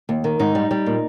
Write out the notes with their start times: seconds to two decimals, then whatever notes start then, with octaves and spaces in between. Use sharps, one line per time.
0.09 D#2
0.24 D#3
0.39 G#2 D#4
0.55 G3
0.71 G3
0.86 A#2